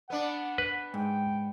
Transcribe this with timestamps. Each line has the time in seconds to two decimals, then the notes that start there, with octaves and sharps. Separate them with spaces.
0.10 B3 D4 F#5
0.58 B4
0.94 G#2 G5